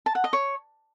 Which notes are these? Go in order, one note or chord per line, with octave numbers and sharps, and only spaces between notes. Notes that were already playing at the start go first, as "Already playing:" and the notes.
A5
F#5
D#5
C#5